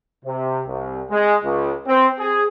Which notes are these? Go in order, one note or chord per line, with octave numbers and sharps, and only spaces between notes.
C3
C2
G#3
C#2
C4
G#4